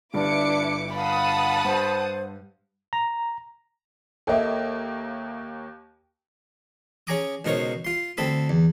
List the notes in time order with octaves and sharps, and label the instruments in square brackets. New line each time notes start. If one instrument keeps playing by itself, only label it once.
[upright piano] G1 G2 [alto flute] D4 [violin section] E4 D6 C#7
[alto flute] F5 [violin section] F#5 A5 D#6 [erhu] B5
[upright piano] G2 [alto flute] C5
[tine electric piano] A#5
[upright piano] D#2 A#3 [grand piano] A4 D#5 E5
[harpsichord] C#4 G#4 G#5 A#5 D6 D#6
C#2 B2 D#4 A#4 C5 C#5
F4 C6
D2 C4 A4 B5 D#6
E2